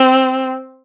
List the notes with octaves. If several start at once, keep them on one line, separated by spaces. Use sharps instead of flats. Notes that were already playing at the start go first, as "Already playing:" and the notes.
Already playing: C4